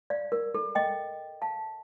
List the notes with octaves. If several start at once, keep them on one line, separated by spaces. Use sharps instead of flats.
D5 F5
A#4
A4
D#5 G5
F5 A5